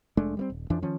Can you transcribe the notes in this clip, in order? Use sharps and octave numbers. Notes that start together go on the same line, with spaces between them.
F1 G#3 A3 D4
G3 A3 C4
D#1
F2 E3 F3 D4
D#3 F3 C#4